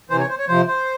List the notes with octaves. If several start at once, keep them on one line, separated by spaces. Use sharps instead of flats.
C3 E3 C5
C#5
C5
C#5
C3 F3 C5
C5